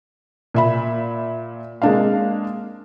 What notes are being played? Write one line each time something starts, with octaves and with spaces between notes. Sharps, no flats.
A#2 E5 B5
G#3 A#3 C4 D4 D5 F5